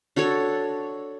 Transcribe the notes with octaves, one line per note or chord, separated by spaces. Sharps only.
D4 F#4 A4 C#5